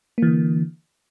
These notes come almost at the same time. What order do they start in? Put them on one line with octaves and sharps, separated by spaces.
A#3 E3 D3